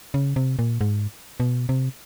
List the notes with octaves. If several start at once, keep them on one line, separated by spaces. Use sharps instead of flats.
C#3
C3
A#2
G#2
B2
C3